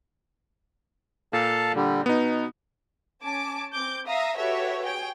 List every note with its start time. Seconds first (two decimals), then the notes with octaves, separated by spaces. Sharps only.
1.33 A#2 A4 F5 A5
1.75 D3 G3
2.06 B2 B3 D#4
3.22 C#4 G#5 A5 D6
3.72 C4 D6 G6
4.06 E5 F5 A#5 D#6
4.36 F#4 G4 A4 B4 C#5 E5
4.84 G#4 C#5 G5